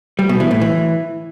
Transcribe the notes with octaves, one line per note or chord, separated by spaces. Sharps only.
G3
B2
E3
A2
E3